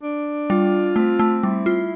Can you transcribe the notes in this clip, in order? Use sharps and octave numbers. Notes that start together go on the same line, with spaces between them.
D4
G3 F4
A3 C4
A3
G3 E4
F4